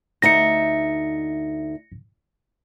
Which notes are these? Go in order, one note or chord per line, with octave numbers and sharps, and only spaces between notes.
D2 D#4 E5 A#6 C#7